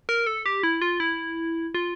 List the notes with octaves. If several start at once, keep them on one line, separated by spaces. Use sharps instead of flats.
A#4
A4
G4
E4
F4
E4
F4